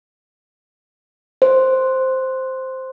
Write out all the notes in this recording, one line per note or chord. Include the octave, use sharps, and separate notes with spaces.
C5